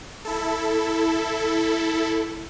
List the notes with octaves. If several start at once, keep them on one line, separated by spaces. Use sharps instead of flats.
E4 A4